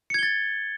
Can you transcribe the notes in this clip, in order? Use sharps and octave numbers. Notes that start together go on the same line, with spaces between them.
G#6 A6 C#7 G7